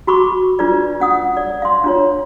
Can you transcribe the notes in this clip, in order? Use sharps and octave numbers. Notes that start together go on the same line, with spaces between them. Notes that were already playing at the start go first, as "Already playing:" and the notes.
F#4 B5 C#6 D6
D4 F4 B4 D5
C#4 F#5 D#6
D5
F5 C6
D4 F4 C#5